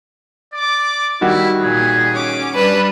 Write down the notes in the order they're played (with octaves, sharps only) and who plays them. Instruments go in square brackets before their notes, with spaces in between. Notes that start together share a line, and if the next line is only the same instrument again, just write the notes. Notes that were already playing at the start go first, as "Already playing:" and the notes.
[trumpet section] D5 D6
[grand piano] D#3 G3 F#4 [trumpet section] E4
[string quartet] A#2 [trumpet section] G#4
[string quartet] C#4 D6
[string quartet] G3 D4 [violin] B4